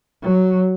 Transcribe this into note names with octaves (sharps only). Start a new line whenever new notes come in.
F#3